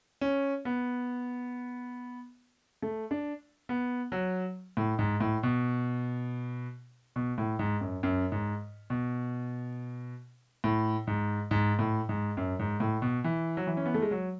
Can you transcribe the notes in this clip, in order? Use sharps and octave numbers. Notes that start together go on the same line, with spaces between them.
C#4
B3
A3
D4
B3
F#3
A2
G#2
A2
B2
B2
A2
G#2
F#2
F#2
G#2
B2
A2
G#2
G#2
A2
G#2
F#2
G#2
A2
B2
E3
F#3
E3
C#4
B3
A3
G#3
F#3